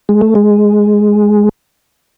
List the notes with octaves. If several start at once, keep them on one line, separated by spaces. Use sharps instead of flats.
G#3
A3
G#3